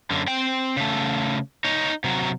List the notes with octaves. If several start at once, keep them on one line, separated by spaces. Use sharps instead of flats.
F#2 D3
C4 G5
C#3 A3
D#4 C#5
C3 F#3